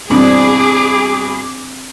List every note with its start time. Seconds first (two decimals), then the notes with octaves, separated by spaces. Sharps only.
0.10 G2 B2 E3 C4 D4 G#4 D6